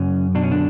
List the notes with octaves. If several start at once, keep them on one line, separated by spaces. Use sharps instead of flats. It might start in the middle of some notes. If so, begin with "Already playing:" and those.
Already playing: F#2 C#3 C#4
B2 D4
C#4
D3 D4